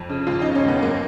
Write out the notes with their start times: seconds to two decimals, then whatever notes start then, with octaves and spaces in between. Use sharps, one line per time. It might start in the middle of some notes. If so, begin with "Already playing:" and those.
Already playing: F2
0.09 C#3
0.27 D#2 F4
0.42 C#3 D#4
0.55 C#4
0.64 D#2 B3
0.82 F#2 A#3